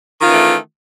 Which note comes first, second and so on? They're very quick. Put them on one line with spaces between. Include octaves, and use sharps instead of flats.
D#3 F4 C#4 E3 A3